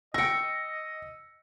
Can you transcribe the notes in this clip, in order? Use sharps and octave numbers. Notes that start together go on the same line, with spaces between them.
D#5 G5 C#6 E6 A#6 C#7